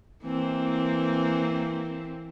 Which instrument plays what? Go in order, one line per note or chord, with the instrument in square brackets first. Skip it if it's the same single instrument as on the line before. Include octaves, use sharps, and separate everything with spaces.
[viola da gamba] E3 A#3 C4